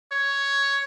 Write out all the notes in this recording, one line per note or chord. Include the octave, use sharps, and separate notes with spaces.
C#5